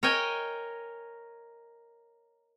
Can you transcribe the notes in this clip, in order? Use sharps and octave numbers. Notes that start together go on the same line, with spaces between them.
A#4 C#5 D#5 G5 G#5